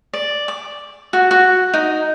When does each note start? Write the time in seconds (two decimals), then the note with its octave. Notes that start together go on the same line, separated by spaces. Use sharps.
0.13 D5
0.48 D6
1.13 F#4
1.31 F#4
1.73 D#4